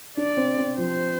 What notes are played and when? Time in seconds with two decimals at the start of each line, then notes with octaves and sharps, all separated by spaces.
0.17 D4 D5
0.37 C4
0.58 C4
0.78 F3 C5